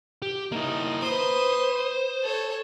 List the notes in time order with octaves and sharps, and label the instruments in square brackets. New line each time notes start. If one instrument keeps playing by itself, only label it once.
[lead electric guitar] G4
[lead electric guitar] A#3 E4 [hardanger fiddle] D#4
[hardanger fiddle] B4 D#6 [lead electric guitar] C5
[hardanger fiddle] A4 C#5